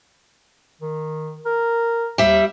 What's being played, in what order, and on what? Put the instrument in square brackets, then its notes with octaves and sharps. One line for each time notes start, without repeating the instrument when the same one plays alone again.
[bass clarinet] D#3
A#4
[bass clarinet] D#2 [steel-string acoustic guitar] G3 E5